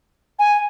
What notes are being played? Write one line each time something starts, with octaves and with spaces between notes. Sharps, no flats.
G#5